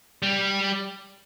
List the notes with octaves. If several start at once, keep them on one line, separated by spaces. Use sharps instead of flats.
G3